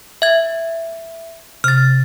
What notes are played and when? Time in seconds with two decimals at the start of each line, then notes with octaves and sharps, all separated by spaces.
0.22 E5 G#6
1.64 C3 F6 A6